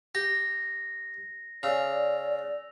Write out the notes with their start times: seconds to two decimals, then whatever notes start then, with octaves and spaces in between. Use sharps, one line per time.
0.15 G4 A#6
1.63 C#3 D5 E6 F7